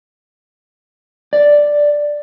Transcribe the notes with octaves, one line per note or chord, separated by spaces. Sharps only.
D5